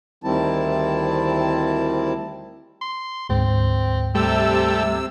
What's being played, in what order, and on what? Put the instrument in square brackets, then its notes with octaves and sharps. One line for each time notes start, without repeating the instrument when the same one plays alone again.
[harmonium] D2 D#3 G3 C4 E4 A5
[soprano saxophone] C6
[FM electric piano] D2 G#2 [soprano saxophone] C4
[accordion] C3 E6 [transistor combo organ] G3 A3 [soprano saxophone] C4